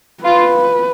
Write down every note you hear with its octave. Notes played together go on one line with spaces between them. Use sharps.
F4 B4